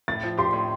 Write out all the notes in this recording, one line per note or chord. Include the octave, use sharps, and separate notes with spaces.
A2 A6
F3
G4 C6
A2